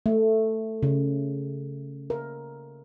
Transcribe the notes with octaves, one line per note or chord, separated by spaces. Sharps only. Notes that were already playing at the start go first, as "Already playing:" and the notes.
A3
C#3
A#4